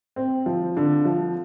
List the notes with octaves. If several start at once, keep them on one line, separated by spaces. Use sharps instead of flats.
C4
F3
D3
F3